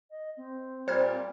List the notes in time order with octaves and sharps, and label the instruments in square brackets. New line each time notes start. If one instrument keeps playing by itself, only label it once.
[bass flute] D#5
C4
[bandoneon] A#2 G3 [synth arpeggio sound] C5 F6 G#6